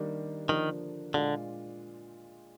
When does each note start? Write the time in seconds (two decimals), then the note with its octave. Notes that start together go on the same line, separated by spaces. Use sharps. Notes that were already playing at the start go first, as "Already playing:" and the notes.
Already playing: D#3 G3 A#3 D4
0.49 D3 D#3 F3 A#3 D4
1.14 A#2 D3 G#3 D4 F4